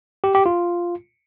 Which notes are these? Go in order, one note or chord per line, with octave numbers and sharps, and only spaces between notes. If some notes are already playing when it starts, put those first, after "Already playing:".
G4
G4
F4